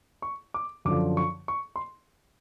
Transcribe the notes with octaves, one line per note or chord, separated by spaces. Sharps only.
C#6
D6
F#2 D3 F3 D6
C#6
C#6
C6